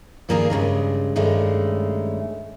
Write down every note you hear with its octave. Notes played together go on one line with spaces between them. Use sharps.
G2 D#3 A#3 D4 G#4 A#5
G2 A#2 C#3 G#3
G2 D#3 G#3 A3 C#4